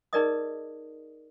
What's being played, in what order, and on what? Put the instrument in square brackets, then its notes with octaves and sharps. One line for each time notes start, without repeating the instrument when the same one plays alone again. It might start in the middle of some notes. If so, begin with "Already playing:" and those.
[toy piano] D#4 G#4 A#4 D5 D#5 D#6